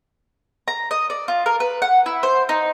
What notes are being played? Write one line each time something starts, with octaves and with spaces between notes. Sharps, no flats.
A#5
D#5
D5
F4
A#4
B4
F#5
E4
C5
D#4